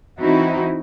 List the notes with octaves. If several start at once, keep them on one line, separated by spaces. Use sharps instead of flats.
E3 C4 D#4 E4 F#4